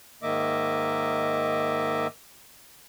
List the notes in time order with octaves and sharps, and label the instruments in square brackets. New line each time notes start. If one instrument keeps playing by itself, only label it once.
[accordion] G#2 D#3 A#3 D#5 E5 D6